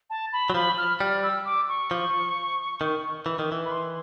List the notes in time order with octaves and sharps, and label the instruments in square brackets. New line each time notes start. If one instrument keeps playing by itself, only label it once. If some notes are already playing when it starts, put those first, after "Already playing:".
[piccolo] A5
B5
[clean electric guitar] F#3
[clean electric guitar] F3 [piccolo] B5
[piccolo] F6
[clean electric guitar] G3 [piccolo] F6
[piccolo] E6
D6
C#6
[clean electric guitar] F3
D#3
E3
D#3
E3
[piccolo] B5
C6